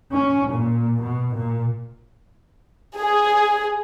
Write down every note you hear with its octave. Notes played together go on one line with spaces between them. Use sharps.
C#4
A#2
B2
A#2
G#4